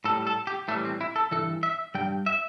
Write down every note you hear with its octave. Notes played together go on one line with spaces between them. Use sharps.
A2 G3 A4
A4
G4
A2 E3 G3 A3
C4
E4
A4
G2 E3 A4
E5
G2 G3 G5
E5